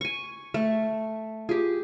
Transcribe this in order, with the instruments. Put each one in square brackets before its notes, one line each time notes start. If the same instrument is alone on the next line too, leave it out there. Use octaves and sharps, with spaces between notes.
[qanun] G#5 C#6
A3
[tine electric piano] F4 [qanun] G4 G#4